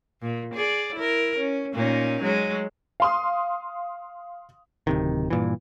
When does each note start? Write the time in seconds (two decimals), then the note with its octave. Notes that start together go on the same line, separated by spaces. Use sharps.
0.22 A#2
0.54 G#4 D5
0.95 E4 A#4
1.37 C#4
1.74 A#2 C#4 D#4
2.22 F#3 G#3
3.00 F5 C6 D#6
4.87 D1 C3 D#3
5.30 G2 A#2 E3